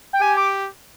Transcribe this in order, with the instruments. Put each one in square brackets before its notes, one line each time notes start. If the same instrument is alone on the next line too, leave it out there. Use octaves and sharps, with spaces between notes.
[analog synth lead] G5
[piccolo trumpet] G4 [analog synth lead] G#5
[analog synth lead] D6